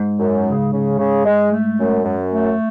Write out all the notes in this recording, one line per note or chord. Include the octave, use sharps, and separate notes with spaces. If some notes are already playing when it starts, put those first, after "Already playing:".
Already playing: G#2
F#2
C#3
C#3
C#3
G#3
A3
F#2
F#2
A3